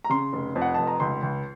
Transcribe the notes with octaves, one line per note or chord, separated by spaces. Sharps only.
A#5
C#3 C6
F1
F2
F#5
F1 A5
A#5
C#2 C6
C#2